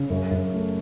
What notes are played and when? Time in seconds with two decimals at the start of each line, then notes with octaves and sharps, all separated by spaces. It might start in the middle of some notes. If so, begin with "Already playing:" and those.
Already playing: C#3
0.10 F#2
0.31 F#2
0.53 A3